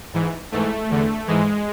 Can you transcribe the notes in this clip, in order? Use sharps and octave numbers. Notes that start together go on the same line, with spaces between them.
G#2 E3
G#2 E3 A3
E2 D3
G#2 E3 G#3